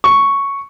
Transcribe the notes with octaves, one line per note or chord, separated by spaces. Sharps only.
C#6